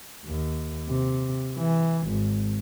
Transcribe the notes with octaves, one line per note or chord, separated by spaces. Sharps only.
D#2
C3
E3
G#1